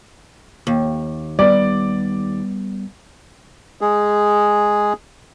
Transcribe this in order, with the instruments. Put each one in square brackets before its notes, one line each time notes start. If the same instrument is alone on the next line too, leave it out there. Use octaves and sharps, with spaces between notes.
[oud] D#2
[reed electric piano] G3 B3 [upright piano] D5
[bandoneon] G#3 G#4